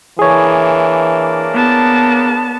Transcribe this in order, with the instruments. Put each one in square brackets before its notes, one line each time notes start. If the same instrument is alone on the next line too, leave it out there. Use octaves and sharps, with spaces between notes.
[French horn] E3 [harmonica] A#3 D4 [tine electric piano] G#4 C#5
[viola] B3 A5